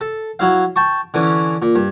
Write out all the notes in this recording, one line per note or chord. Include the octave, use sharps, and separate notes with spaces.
A4
F#3 E4 F5
G5 A5 C#6
D3 E3 C#4
A#2
G2